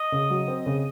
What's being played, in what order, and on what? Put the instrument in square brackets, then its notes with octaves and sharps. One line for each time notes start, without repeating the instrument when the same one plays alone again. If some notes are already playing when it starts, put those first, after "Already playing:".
Already playing: [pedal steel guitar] D#5
[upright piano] C#3
F#3
C4
C#3